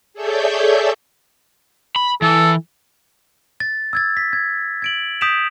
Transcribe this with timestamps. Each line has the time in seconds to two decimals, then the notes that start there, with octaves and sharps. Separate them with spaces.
0.14 G#4 A4 C#5 D5 E5 G6
1.96 B5
2.22 E3 A4
3.60 A6
3.93 E6 G#6 A6
4.17 B6
4.33 G#6
4.82 G#6 D7 F#7
5.21 D#6 G6 B6 D7 E7 F7